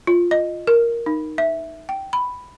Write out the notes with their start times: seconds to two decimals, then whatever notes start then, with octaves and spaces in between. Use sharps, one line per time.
0.07 F4
0.31 D#5
0.67 A#4
1.06 D#4
1.38 E5
1.89 G5
2.13 B5